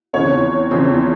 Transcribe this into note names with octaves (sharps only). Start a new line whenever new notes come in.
E2 C#3 F3 C4 C#5
E2 C#3 F3 C4